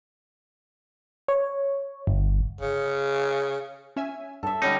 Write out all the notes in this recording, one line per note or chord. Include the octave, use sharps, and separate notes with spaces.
C#5
G1
C#3
C#4 E5 G#5
G2 A4 E5
D3 F#3 G3 C#4 D#4